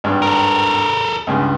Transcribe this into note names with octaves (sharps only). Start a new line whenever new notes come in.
G#1 G2
A4 A#4
C#2 G2 C#3